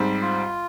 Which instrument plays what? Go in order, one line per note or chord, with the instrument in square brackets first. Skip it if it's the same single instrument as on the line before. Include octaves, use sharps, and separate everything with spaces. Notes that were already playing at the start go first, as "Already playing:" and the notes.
Already playing: [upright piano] G#2 G3 C4
[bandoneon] F4